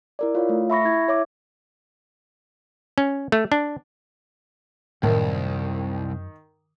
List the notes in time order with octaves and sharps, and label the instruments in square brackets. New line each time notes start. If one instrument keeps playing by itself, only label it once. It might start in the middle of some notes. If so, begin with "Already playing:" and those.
[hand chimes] E4 A#4 D5
F4 C#5 F5
A3
E5 B5 C#6 A#6
E4 G#6
E4 C#5 E5 D6
[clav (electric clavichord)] C#4
A3
D4
[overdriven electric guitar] C2 [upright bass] F#2 [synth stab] A2 [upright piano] D#3